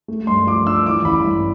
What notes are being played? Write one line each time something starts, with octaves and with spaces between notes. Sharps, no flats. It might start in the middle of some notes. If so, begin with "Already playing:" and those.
A3
G2 C6
F3 D6
D4 E6
E3 D6
A1 B5
G2